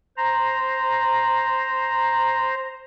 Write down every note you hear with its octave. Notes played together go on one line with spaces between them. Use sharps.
C5 A#5